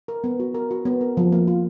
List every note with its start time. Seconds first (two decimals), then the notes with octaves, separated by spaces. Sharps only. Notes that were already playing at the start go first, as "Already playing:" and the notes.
0.08 A#4
0.24 B3
0.40 F#4
0.55 A#4
0.71 F#4
0.85 B3
1.01 A#4
1.17 F3
1.32 A#3
1.48 F4